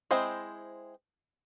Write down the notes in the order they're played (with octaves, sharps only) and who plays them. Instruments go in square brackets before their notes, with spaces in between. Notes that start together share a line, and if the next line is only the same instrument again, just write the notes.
[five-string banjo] G#3 C4 E4 C5 D#5